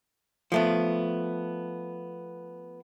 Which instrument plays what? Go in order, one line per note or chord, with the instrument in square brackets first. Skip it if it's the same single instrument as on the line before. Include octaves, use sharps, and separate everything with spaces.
[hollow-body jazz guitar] F3 A3 B3